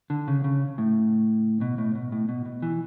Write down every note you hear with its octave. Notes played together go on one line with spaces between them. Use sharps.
D3
C#3
C#3
A2
B2
A2
B2
A2
B2
B2
E3